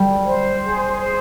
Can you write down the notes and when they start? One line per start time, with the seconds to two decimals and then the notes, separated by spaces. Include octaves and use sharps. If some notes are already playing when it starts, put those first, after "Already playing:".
Already playing: G3
0.26 C5
0.62 G#4
1.00 C5